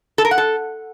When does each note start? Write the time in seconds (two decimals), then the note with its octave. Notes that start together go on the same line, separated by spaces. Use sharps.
0.18 A4
0.25 A#4
0.31 F#5
0.38 A4